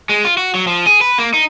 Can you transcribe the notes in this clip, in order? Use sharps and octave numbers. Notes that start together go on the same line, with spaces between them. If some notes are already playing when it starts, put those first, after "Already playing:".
G#3
F4
F#4
F#3
F3
G#4
B4
A#3
D#4